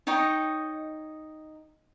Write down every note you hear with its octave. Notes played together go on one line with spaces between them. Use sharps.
D#4 C#5 D#5 G5